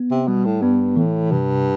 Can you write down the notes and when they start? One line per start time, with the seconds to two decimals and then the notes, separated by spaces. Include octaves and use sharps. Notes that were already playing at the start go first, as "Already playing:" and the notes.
Already playing: B3
0.11 C3
0.28 B2 G3
0.45 A2
0.62 G2 B3
0.96 A2 E3
1.31 G2 C3